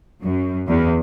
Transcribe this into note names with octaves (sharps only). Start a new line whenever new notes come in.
F#2
E2